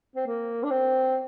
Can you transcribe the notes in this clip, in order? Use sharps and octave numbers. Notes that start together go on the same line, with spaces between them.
C4
A#3
D4
C4